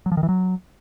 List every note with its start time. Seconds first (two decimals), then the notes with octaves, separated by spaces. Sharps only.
0.06 F#3
0.12 F3
0.17 D#3
0.23 E3
0.29 F#3